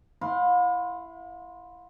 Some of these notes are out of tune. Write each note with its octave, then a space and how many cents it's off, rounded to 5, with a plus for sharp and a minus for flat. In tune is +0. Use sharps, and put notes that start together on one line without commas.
E4 +15 F5 +45 C6 +10